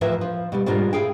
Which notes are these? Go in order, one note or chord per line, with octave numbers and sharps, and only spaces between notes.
E2 A2 F3 A#4 B4 E5
F3
B2 G3 D#4
G#2 B2 G3 D4 F4 A#4
A2 G#4 F5 G5